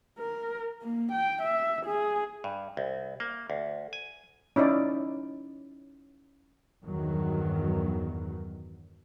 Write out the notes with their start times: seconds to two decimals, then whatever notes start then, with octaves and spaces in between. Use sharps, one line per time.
0.19 A#4
0.82 A#3
1.12 G5
1.42 E5
1.86 G#4
2.44 G2
2.77 C2
3.20 A#3
3.50 D2
3.93 G#5
4.56 C#4 D#4 E4 D5
6.85 E2 G2 D#3 F#3